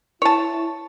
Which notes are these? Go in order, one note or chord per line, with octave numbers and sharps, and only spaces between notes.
E4 C#5 A5